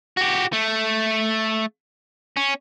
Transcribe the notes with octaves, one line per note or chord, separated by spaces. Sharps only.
F#4 G4
A3
C#4